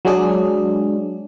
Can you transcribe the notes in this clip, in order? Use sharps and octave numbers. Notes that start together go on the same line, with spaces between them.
F#3 G#3 D4 G#4